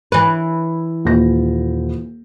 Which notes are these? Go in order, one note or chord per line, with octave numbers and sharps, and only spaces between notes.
E3 B4
D#1 A#6